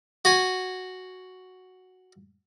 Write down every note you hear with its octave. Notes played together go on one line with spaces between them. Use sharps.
F#4 G#5